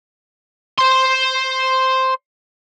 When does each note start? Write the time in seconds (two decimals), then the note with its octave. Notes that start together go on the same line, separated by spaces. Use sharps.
0.78 C5 C6